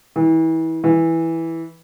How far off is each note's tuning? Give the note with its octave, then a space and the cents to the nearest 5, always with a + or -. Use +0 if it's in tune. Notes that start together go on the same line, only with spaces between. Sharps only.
E3 -30
E3 -5